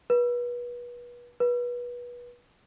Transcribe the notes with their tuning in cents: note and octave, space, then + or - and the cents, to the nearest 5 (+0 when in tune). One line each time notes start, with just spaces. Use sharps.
B4 -30
B4 -25